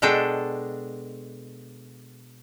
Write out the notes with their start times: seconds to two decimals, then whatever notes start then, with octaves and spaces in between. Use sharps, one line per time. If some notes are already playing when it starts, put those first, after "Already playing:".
0.02 B2 G#3 D4 A4 G5